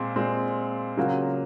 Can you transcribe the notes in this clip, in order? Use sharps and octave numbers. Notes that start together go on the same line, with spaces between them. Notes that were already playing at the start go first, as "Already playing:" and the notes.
Already playing: A#2 G#3 C4
A#2 G#3 C4
C#3 F#3 A#3 F4